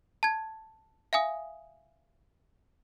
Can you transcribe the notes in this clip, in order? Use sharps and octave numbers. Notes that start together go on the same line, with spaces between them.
A5 G#6
E5 F5 G#5 D#6